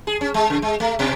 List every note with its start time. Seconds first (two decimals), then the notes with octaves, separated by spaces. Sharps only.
0.07 G#4
0.21 C#4
0.34 G#3
0.50 C#3
0.62 G#3
0.80 A3
0.99 B2